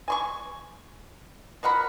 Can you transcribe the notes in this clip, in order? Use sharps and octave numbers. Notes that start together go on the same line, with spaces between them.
G#5 C6 C#6
F3 A#4 F#5 B5